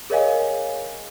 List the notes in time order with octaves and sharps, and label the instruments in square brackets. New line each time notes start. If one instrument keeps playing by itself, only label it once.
[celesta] G#4 A#4 C#5 D#5 F5 G#5